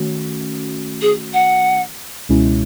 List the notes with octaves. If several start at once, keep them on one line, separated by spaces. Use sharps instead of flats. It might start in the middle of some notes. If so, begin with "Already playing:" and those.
Already playing: D#3 A3 C#4 F#4
G#4
F#5
C#2 B2 G#3 C#4 E4